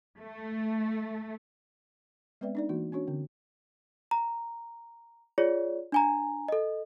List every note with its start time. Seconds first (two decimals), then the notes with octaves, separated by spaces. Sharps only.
0.22 A3
2.41 G#3 B3 C4 B4 D5 E5
2.55 D4 D#4 D5
2.69 E3 A#3 F#4
2.92 C#4 D4 F#4 C#5
3.07 D3 C4
4.11 A#5
5.38 F4 G#4 C#5 D5
5.92 D4 G#5 A#5
6.48 A4 D#5